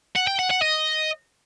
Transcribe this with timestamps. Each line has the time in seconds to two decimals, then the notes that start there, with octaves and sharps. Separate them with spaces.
0.16 F#5
0.27 G5
0.39 F#5
0.50 F#5
0.62 D#5